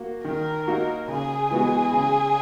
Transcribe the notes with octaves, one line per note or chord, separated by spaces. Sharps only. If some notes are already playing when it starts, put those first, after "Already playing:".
Already playing: A#3 F#4
D#3 A#4
A#3 D#4 F#4
C#3 G#4
E3 G#3 B3 F#4
C#3